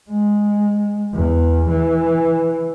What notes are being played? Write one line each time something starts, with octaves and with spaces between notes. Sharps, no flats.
G#3
E2
E3